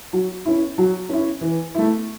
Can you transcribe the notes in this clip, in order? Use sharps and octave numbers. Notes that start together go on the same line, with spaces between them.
F#3
C#4 E4
F#3
C#4 E4
E3
A3 E4